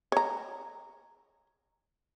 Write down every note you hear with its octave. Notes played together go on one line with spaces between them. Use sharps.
C#5 A#5